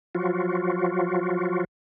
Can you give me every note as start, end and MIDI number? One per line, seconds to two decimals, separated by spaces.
0.15 1.64 53
0.15 1.64 54
0.15 1.64 65
0.15 1.64 66